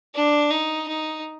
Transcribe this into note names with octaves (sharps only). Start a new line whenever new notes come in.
D4
D#4
D#4